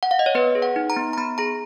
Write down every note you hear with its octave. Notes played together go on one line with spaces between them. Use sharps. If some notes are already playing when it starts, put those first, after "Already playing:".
F#5
F5
D#5
C#5
B3 B4
G#4
F#5
D#4
A#5
B3
A#5
B3 B5
G#4 A#5